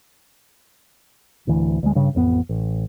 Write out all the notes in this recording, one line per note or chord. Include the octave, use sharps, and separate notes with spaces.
D1 D2 E3
D2 G#3
G2 C#3
A1 F2 A#3 B3
A1